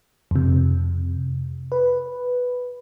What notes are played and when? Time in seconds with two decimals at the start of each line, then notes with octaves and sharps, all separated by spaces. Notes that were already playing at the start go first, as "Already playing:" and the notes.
0.31 F2 C3
1.72 B4